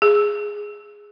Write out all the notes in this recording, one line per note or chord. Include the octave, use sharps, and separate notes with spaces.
G#4